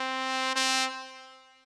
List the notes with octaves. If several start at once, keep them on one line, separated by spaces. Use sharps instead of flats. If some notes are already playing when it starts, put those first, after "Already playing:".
Already playing: C4
C4